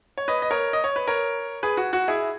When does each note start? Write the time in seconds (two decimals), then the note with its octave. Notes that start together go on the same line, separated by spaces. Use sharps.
0.18 C#5
0.28 B4 D#5
0.42 D#5
0.51 A#4 C#5
0.73 D#5
0.84 C#5
0.96 B4
1.07 A#4 C#5
1.63 G#4 B4
1.77 F#4
1.93 F#4
2.08 E4 G#4